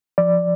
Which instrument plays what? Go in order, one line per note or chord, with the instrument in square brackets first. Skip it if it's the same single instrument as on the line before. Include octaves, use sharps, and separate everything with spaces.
[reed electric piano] F3 D5